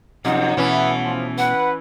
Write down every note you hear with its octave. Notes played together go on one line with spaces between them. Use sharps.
F#2 C3 F3 C4 D#4 F#5
B2 E3 A3 B3 C#4 E4
F3
B4 F#5